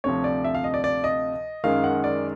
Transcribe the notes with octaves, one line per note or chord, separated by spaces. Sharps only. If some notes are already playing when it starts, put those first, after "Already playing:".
D2 C3 F3 C#5
D5
E5
F5
D#5
D5
D5
D#5
F#2 D#3 G#3 F5
F#5
D5